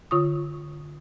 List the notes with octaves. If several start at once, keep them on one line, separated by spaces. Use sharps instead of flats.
D3 F4 C#6 D#6